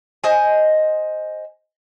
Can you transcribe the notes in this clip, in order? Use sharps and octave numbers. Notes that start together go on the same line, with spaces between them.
C5 D#5 G#5